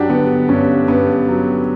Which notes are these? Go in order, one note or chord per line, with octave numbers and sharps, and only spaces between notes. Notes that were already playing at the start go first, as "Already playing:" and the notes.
Already playing: G2 F#3 D4 F#4 G4
D3 B3
G2 C#4
G2 B3
F#3